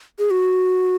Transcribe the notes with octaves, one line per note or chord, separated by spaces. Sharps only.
G#4
F#4